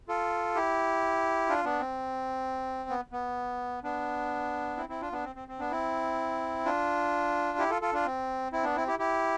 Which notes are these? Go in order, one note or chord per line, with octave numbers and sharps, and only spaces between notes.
F4 A4
E4 G4
D4 F4
B3 D4
C4
B3
B3
B3 D4
C4 E4
C4 E4
D4 F4
B3 D4
C4
C4
C4
B3 D4
C4 E4
D4 F4
E4 G4
F4 A4
F4 A4
D4 F4
C4
C4 E4
B3 D4
C4 E4
E4 G4
E4 G4